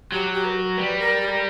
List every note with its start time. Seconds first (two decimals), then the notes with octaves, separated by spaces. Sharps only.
0.11 F#3 G4
0.33 G4
0.45 B4
0.49 A#4
0.77 G3 B4
0.99 A#4
1.21 G4
1.29 A#4